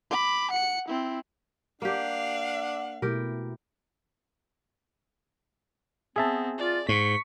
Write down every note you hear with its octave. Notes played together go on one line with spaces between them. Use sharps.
B5 D6
F#5 C#7
C4 E4
A#3 D4 G4 F5 F#5
B2 A3 E4 G4 A#4
B3 C4 G#4 E5 A5
F4 D5
G#2 C#6 B6